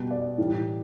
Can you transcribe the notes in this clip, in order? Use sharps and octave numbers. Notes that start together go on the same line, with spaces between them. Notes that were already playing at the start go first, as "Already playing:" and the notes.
Already playing: B2 G3
D5
A2 E3 G3